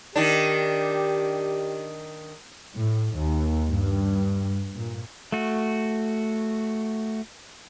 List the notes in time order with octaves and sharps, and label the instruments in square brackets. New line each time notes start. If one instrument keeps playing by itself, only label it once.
[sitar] D#3 D4 [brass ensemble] G4
[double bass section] A2
D#2
G2
A#2
[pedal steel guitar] A3 F#4